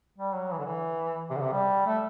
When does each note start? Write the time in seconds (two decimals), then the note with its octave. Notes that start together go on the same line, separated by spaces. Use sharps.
0.18 G3
0.34 F#3
0.52 E3
0.59 D3
0.66 E3
1.30 C3
1.37 D3
1.42 C3
1.53 G3
1.86 A3